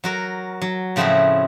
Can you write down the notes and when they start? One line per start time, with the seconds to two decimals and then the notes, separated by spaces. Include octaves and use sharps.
0.04 F#3 F#4 A#4
0.62 F#3
0.96 A2 C#3 F3 C4 E4 F#4